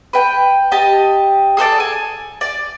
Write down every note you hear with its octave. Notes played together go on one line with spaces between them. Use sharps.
B4 G5
G4 D#5 A5
G#4 A4 C5 D5
G#5
D5